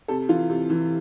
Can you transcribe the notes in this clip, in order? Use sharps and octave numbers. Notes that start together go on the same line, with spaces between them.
C3 A4
E3 F4
C3
E3